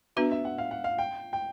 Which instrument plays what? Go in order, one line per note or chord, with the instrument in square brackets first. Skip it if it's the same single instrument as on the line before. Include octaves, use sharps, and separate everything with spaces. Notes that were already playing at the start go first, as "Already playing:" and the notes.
[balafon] B3 D4 F#4 B4 [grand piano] E5
[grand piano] E5
F#5
F5
F#5
F5
G5
G5